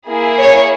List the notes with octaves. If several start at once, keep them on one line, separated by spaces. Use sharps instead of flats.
A#3 E4 G#4
C#5